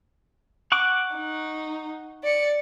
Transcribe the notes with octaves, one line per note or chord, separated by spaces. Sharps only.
F#5 C#6 D6
D#4
D5 C#7